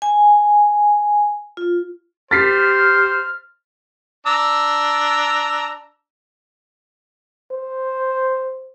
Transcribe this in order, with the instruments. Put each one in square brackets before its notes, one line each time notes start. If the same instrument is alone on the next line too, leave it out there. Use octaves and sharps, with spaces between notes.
[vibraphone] G#5
F4
[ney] G4 [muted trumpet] C5 [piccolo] F6 [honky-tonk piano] A6 B6 C7
[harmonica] D4 A#5 E6
[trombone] C5